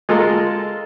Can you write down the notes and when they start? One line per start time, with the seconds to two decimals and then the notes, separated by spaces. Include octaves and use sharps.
0.09 G#3 F4 A4 A#4